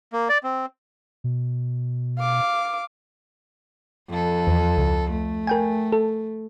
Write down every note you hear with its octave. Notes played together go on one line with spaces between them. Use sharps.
A#3
D5
C4
B2
F5 D6
F2 A4
E2
C#2
A3
A#4 G5 G#5
A4